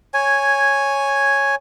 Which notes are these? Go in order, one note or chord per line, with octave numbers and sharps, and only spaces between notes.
C#5 G#5